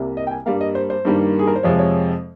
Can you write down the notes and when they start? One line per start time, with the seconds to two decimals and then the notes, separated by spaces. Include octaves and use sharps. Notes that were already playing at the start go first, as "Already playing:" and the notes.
Already playing: C2 C3 G3 A#3
0.17 D#5
0.27 G5
0.31 G#5
0.46 G2 G3 A#3 F5
0.61 D#5
0.75 C5
0.90 C5
1.05 G2 D#3 G3 A#3
1.39 G#4
1.47 A#4
1.56 C5
1.63 F2 C3 F3 G#3 C#5
1.79 C#5